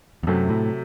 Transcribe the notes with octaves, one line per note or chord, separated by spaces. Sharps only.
E2
F#2 C3 F#3 A3
A2